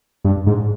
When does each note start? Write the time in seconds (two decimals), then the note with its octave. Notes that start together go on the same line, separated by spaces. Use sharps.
0.24 G2
0.47 G#2